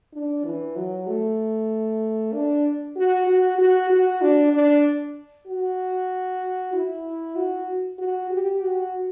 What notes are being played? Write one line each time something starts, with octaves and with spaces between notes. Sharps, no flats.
D4
E3
F#3
A3
D4
F#4
F#4
F#4
F#4
D4
D4
F#4
E4
F#4
F#4
G4
F#4